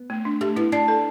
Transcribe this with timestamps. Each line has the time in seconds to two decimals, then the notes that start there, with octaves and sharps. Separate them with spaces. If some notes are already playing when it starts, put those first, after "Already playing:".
Already playing: B3
0.10 A3
0.25 D4
0.41 A3 G4
0.56 B3 E4
0.72 D4 D5
0.88 A4